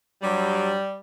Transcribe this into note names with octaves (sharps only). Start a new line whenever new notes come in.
G2 F#3 G3